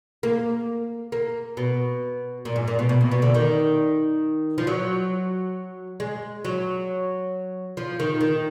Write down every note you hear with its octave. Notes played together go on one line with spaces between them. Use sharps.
A#3
A#3
B2
A#2
G#2
A#2
B2
B2
A#2
B2
D3
D#3
F3
F#3
G#3
F#3
F3
D#3
D#3